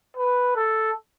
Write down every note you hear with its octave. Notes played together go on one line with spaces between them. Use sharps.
B4
A4